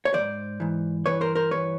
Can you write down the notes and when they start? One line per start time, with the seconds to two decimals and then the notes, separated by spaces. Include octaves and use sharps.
0.05 C#5
0.14 E3 C5 D5
0.18 G#2
0.60 G#2 E3
1.06 G2 E3 B4 C#5
1.21 A#4 C5
1.36 A#4 C5
1.51 G2 E3 B4 C#5